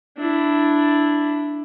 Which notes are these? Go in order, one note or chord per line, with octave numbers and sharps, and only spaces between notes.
D4 E4